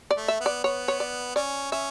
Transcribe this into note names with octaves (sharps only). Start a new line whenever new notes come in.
D5
A3
E5
B3
D5
B3 C#5
C#5
D5
C#4 D5
C#4 E5